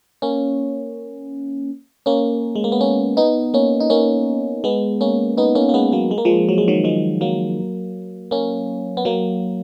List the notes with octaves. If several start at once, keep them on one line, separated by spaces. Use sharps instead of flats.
A#3 C#4
A#3 C#4
G#3
A#3
B3
A#3 C#4
B3 D#4
A#3 C#4
D#4
A#3 C#4
G#3 B3
A#3 C#4
B3 D#4
A#3 C#4
A#3
G#3 B3
F#3 A#3
G#3
A#3
F3 G#3
F#3
G#3
D#3 F#3
F3 G#3
F#3 A#3
A#3 C#4
B3
F#3 A#3